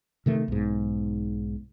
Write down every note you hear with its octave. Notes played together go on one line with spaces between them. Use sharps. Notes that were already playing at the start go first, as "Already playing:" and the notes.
C3 D#3 A3
B1 G#2